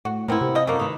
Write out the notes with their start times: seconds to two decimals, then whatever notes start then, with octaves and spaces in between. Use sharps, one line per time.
0.05 A2 F#4
0.28 A2 B3 C4 E4 A#4
0.41 C3
0.55 F3 D#5
0.67 F#2 A3 A#3
0.79 D#3 B4